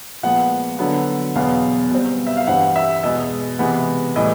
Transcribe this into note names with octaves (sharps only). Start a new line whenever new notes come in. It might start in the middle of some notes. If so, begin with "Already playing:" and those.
A#2 F3 G#3 B3 F#5
D3 F#3 B3
E2 B2 F#3 B3 F5
B2 G3 C4
E5
F5
G2 E3 G3 C4 F#5
E5
E2 B2 G#3 D#5
C3 E3 G#3 B3
A2 E3 G3 D#5